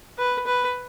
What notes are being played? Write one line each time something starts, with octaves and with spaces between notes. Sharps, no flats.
B4
B4